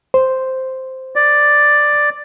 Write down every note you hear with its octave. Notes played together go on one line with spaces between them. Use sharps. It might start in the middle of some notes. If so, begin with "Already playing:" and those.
C5
D5